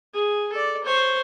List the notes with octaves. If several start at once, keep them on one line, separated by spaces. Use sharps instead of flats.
G#4
A4 D5
C5 C#5